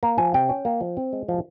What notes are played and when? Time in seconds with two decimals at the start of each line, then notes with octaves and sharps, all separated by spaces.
0.03 A#3 A#5
0.18 F3 G#5
0.34 C3 G5
0.49 C#4
0.65 A#3
0.81 F3
0.97 C4
1.13 G#3
1.28 F3